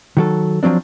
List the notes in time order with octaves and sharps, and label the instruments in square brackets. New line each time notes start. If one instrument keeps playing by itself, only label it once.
[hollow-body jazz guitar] D#3 F#3 A4
F3 F#3 C4 D4